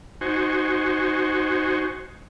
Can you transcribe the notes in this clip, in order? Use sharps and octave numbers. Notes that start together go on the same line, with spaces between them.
D#4 F#4 C5 G#5 C#6